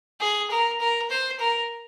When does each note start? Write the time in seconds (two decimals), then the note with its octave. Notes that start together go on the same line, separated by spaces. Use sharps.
0.20 G#4
0.50 A#4
0.80 A#4
1.10 C5
1.39 A#4